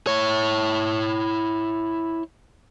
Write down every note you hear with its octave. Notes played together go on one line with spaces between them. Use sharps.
E4 C#5